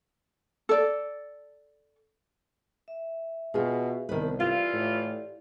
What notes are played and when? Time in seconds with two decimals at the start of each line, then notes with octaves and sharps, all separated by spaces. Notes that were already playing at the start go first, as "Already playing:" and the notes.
0.69 A4 D5
2.88 E5
3.54 B2 F4 G#4
4.09 C2 D#3 B3 B4 A5
4.40 E3 E4 F4 G4 D5 F5
4.73 A2